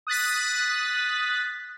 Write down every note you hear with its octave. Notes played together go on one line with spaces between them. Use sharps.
D#6 F#6 A6 B6